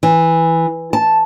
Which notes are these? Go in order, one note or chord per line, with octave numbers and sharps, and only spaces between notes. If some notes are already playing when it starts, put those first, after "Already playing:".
E3
A5